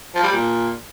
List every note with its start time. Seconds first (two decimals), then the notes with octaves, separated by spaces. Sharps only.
0.15 F3
0.24 G3
0.32 A#2